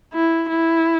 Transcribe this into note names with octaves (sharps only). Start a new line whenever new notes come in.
E4
E4